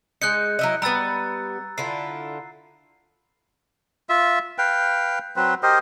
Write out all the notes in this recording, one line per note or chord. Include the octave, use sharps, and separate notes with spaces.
G#3 D#4 F#6 G6 C#7
F#3 E4 D#5
G3 B3 A#5 E6 A6
D3 E4 F4 C7
F4 E5
B4 F5 G5
F#3 C4 B4
G4 A#4 C5 D#5